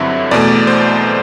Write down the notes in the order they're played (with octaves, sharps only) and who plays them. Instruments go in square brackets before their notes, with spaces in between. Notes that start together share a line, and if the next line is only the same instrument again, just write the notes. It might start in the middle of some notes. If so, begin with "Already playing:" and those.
Already playing: [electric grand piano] G2 D3 F#3 C4 E4 E5
E2 B2 A3 D5
C5